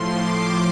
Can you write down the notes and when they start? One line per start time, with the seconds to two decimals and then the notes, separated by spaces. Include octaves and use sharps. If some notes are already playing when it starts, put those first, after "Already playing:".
Already playing: A2 F3 C6
0.13 D6